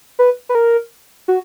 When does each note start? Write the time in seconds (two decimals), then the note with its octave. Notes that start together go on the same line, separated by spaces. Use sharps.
0.19 B4
0.49 B4
0.55 A#4
1.28 F#4